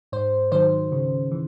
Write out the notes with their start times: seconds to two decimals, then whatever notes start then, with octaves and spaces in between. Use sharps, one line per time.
0.12 G#2 C5
0.52 D#3 F#3 C5
0.92 C#3
1.31 E3